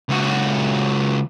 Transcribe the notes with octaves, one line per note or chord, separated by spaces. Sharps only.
C#2 F#4